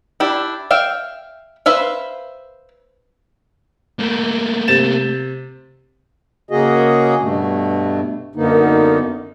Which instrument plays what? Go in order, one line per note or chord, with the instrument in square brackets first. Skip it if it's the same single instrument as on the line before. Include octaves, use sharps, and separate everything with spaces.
[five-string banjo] D4 E4 G4
E5 F5 G5
B4 C5 E5 F5
[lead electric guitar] A3 A#3
[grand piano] C3 A6 E7
[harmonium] C#3 A#3 F#4 G#4 D#5
G2 B2 A3
F#2 D3 A#3 B3 D#4